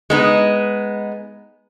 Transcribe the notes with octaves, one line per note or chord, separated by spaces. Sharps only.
G#3 B3 D#4